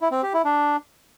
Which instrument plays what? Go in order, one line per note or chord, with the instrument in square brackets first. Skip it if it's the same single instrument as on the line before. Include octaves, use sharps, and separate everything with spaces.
[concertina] E4
C4
G4
E4
D4